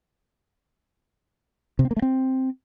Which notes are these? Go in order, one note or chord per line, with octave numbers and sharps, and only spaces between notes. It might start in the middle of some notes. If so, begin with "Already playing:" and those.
C3
C4
A#3
A3
C4